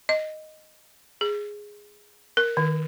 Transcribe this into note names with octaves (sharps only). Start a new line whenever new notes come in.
D#5
G#4
A#4
D#3